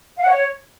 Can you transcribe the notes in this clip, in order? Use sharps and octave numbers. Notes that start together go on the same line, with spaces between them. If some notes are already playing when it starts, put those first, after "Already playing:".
F5
F#5
C#5